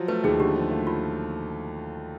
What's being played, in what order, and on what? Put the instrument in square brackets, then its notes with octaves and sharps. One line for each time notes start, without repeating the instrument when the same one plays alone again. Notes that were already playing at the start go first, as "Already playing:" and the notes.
Already playing: [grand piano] F3 F#3
[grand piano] A3 [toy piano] B4
[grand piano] D#2 [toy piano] G#4
[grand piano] D3 [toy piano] G4
[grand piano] F3
A3
[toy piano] F4